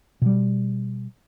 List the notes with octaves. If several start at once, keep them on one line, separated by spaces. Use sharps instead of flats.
B2 G3